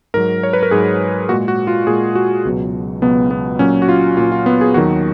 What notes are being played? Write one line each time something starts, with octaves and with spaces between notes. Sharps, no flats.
G#2 F#3 A#4
C#5
B4
A#4
G#2 F#3 G#4
A#2 G#3 F#4
F#4
F4
A#2 G#3 G#4
F#4
C#2 B2 F#3
C#2 B2 F#3 B3
B3
A#2 F#3 C#4
F#4
F4
A#2 F#3 F4
F4
B3
G#4
D#2 D#3 F#3 F#4